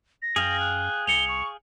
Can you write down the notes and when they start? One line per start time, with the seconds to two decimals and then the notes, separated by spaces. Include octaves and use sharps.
0.22 A#6
0.36 F#2 G#4 F5 G5
0.60 F#6
1.07 C2 C#7 F7 G7
1.29 C#6